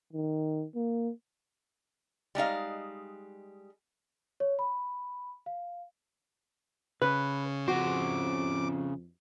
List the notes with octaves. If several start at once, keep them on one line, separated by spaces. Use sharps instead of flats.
D#3
A#3
G3 G#3 D#4 F5
C#5
B5
F5
C#3 B4
F2 C#3 F#4 C5 D6